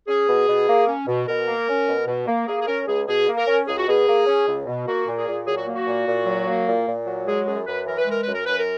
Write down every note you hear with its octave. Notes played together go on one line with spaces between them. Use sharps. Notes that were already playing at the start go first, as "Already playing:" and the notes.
C#4 G#4
B2
B2
A#3
C#4
B2
B2 A#4
A#3
C#4
B2
B2
A#3
A#3 G#4
G#4
C#4 A#4
C#2 G#4
B2 G#4
A#3
A#4
C#4
C#2 G#4
F#4
B2 G#4
A#3
C#4
C#2
B2
A#3 F#4
A#2
G#4
A#2
F#3 G#4
F#4
A#3
F#4
A#2
A#2
F#3
A#3
A#2
A#2
F#3
G#3 G#4
F#2 G#4
F#2 B4
E3 A#4
B4
G#3 A#4
F#2 B4
A#4
F#2 B4
A#4